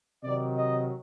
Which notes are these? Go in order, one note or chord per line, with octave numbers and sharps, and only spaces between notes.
C3 D#3 F#3 D5
D#5